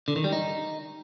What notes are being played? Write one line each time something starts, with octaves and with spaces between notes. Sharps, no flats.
D3
D#3
G3
D#4